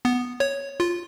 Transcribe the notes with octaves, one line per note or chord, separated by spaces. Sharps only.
B3
C#5
F4